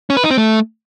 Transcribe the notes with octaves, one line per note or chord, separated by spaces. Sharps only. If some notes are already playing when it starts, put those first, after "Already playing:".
C#4
B4
D#4
C4
A3